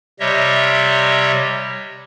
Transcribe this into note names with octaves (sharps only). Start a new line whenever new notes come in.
C3 G3 C#5 D#5 E5